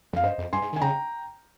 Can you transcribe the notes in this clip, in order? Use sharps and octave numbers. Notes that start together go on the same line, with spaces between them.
F2 F5
G2 C5 D#5
F2
G2 G#5 C6
G#2
D#3 G#5
C#3 G5 A#5